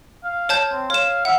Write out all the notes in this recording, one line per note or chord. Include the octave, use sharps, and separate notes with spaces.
F5
C#5 A5 G6
C4
C#5 F5 E7
E5 F#5